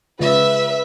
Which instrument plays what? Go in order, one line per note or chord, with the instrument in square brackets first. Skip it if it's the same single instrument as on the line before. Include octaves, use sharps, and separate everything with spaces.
[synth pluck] C#3 G#3 F4 [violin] B4 E5